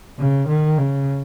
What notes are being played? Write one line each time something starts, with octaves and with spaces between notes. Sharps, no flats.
C#3
D#3
C#3